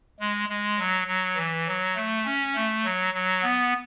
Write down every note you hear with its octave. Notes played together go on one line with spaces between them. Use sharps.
G#3
G#3
F#3
F#3
E3
F#3
A3
C#4
A3
F#3
F#3
B3